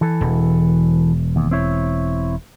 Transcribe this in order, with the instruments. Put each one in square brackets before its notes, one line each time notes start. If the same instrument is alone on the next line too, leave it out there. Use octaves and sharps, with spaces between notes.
[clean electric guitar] E3 A4
[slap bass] E1
[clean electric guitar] D#2
C4 E4 C#5